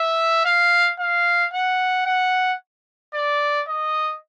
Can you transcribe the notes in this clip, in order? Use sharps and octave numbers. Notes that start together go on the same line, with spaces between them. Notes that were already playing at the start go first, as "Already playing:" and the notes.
Already playing: E5
F5
F5
F#5
F#5
D5
D#5